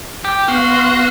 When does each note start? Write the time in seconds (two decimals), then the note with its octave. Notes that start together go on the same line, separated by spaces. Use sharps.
0.25 G4
0.48 B3 F#4 F5 C6